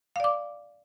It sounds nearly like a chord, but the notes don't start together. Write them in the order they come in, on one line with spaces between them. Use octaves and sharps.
F5 D5 D6